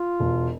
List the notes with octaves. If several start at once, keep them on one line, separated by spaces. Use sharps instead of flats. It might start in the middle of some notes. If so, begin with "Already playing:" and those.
Already playing: F4
E1